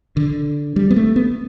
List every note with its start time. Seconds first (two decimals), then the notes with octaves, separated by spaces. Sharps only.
0.17 D3
0.76 G3
0.91 B3
0.96 A3
1.16 B3